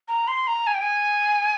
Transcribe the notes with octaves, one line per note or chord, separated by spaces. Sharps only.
A#5
C6
A#5
G#5
G5
G#5